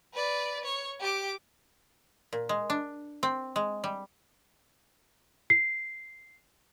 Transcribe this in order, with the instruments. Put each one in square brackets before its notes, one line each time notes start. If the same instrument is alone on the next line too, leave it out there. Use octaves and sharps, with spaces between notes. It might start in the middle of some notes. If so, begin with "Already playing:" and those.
[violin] B4 D5
C#5
G4 D6
[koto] A#2
G#3
D4
C4
G#3
G3
[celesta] C7